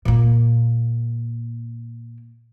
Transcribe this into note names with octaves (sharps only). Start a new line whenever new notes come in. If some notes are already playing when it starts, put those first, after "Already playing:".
A#2 A#3